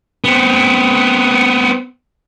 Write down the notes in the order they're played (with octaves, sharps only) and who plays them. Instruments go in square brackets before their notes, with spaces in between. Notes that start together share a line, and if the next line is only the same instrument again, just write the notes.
[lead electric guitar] B3 C4